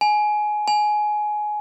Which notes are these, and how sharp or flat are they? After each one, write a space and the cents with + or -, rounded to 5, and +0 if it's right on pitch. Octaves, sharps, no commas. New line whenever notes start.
G#5 +20
G#5 +20